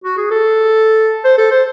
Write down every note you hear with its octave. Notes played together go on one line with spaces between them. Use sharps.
F#4
G#4
A4
C5
A4
C5